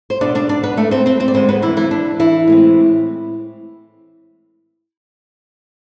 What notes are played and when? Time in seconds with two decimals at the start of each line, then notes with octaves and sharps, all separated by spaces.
0.10 C5
0.21 B2 B3 D4 D5
0.35 D4 D5
0.49 D4 D5
0.63 B3 B4
0.77 A3 A4
0.91 C4 C5
1.06 C4 C5
1.20 C4 C5
1.28 D5
1.34 D3 G#3 B3 C4 C5
1.49 B3 B4
1.62 E3 E4
1.77 E3 E4
1.91 D4
2.20 E3 E4
2.47 A2 G#3 C4